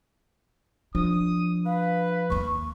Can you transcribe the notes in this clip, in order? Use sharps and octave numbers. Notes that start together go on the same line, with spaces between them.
F3 D4 D#6
B4 F5
D#2 A#3 C#6